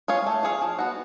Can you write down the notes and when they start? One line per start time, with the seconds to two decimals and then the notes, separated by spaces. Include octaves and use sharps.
0.08 F4 G#4 C#5 F5
0.26 A3
0.43 F4 G#4 C#5 F5
0.62 F3
0.79 B3 F#4